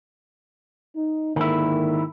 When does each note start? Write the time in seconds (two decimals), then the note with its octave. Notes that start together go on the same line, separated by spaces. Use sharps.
0.96 D#4
1.36 G#2 D3 D#3 A#3 E4